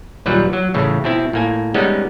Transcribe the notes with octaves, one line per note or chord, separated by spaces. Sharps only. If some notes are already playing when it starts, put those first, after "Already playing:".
D#2 A#2 F#3 G3 B4
F#3
A2 C#3 E3
B2 C4 E4
A2 A#3 G#5
G3 G#3 B3 C#4 D#4